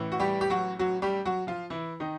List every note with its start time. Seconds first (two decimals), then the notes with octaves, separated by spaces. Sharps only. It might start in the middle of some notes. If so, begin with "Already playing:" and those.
Already playing: A1 A2 E3
0.12 F#4
0.20 G3 G4
0.41 G4
0.50 F#3 F#4
0.79 F#3 F#4
1.02 G3 G4
1.25 F#3 F#4
1.47 F3 F4
1.70 E3 E4
2.00 D#3 D#4